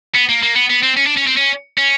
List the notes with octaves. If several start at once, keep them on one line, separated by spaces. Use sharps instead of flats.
B3
A#3
A#3
B3
B3
C4
C#4
D4
C#4
C4
C#4
C#4